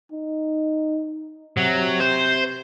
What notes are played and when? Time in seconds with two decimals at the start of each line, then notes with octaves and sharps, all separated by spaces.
0.12 D#4
1.58 C3 F#3
2.01 C5